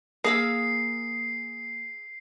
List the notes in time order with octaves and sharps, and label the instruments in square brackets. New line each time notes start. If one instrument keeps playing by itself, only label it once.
[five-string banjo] A#3 [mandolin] G#4 F5 E6 [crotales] C7